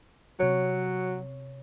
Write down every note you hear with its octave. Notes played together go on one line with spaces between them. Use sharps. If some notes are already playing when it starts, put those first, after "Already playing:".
C3 F#3 C#5